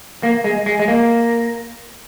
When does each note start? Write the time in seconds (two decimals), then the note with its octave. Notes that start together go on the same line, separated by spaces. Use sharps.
0.23 A#3
0.44 G#3
0.66 G#3
0.80 G#3
0.88 A#3